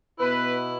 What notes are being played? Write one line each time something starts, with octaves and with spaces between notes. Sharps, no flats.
B2 B3 E4 B4